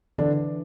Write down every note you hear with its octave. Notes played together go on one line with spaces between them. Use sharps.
D3 E3 D4